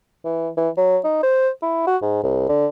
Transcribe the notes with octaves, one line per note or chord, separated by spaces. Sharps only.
E3
E3
F#3
D#4
C5
E4
F#4
G#2
C2
D3